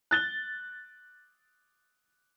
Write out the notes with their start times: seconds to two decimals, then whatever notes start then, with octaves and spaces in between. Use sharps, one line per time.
0.11 F#6 A6 G7